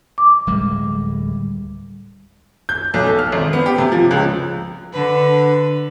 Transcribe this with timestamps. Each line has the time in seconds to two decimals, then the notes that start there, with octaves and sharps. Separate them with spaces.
0.18 D6
0.47 D1 G3 G#3
2.69 G6
2.94 B1
3.06 A4
3.19 F6
3.32 G#1
3.53 B3
3.66 G4
3.78 C3
3.92 F3
4.11 C#2
4.91 D3 B4